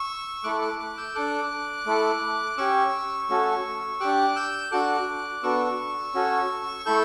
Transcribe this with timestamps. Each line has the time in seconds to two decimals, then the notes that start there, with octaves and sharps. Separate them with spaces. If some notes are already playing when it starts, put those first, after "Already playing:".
Already playing: C#6 E6
0.44 A3 E4 A4 D6 F#6
0.61 D6 F#6
0.79 D6 F#6
0.97 E6 G6
1.15 D4 A4 D6 F#6
1.86 A3 E4 A4
2.57 C#4 G4 C#6 E6
3.29 A3 C#4 F#4 A4
4.00 D4 G4 D6 F#6
4.36 E6 G6
4.71 D4 F#4 A4 D6 F#6
5.43 B3 D4 F#4 A4 C#6 E6
6.14 C#4 F#4 A4
6.86 A3 E4 A4 E6 G6